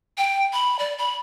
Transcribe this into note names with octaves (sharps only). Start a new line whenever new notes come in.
G5
B5
D5
B5